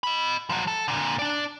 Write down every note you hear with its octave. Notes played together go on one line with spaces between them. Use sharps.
D#5 B5
F3 F#3
A4
A#2 D3
D4 D5